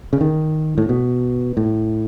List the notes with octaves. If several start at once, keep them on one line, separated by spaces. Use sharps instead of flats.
C#3
D#3
A2
B2
A2